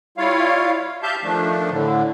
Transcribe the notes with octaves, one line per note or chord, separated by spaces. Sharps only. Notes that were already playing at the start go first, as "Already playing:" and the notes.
G3 E4 F4 C#5 F5
G4 E5 F5 A5 G6
D#3 F3 A3 D4
A2 D3